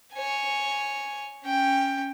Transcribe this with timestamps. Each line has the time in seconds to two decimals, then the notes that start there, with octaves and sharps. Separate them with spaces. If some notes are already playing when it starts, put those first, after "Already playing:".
0.14 C#5 G#5
1.44 C#4 G5